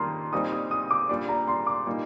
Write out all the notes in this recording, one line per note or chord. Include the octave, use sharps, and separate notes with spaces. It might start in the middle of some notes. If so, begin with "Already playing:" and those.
Already playing: F2 D#3 G3 A#3 A#5 C6 D#6 F6
A#2 G3 C4 D#4 D#6
D#6
D#6
D6
A#2 G3 D4
A#5
C6
D6
A#2 G3 A#3 D#4